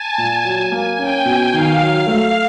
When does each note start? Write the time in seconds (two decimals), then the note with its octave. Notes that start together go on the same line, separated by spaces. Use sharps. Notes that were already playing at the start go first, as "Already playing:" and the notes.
Already playing: G#5 A5
0.18 A#2
0.45 F#3 G#5
0.72 A#3
0.99 C#4 G5
1.25 B2
1.53 D#3 F5
1.81 F#3
2.07 A3